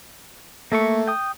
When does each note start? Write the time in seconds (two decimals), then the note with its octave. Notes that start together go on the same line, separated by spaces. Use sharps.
0.72 A3 A#3 E5 C#6
1.07 G5 D#6